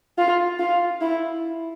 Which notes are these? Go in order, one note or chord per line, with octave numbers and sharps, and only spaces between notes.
F4
F4
E4